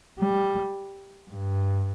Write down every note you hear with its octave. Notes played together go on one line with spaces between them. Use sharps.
G3
G2